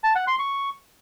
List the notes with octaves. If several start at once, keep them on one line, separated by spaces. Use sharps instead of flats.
A5
F#5
C6
C#6